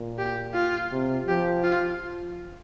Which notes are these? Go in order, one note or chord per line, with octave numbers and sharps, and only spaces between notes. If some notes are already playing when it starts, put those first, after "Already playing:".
Already playing: A#2
G4
F4
C3
F3 G4
F4